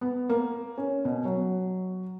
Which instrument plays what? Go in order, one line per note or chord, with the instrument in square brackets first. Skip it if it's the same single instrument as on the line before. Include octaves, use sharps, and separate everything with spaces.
[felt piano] B3
A#3
C#4
B2
F#3